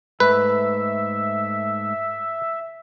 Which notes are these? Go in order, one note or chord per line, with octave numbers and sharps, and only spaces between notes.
G#2 A3 B4 E5